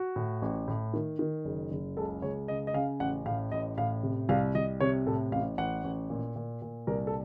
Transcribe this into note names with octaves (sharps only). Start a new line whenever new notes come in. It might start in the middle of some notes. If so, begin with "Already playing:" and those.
Already playing: F#4
A2
A1
A2
D#3
D#3
F#1
F#1
C#2 A4
C#2 C#5
C#3 D#5
D#5
C#3 F5
A1 F#5
A2 F5
A1 D#5
A2 F5
C3
C2 F5
C2 D#5
C3 C#5
A2 A4
A1 F5
A1 F#5
A1
A#2
A#2
A#2
C2 A#4
A4